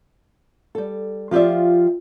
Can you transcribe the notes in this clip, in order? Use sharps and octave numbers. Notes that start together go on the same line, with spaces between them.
G3 A4
F3 F4 G4 D5 E5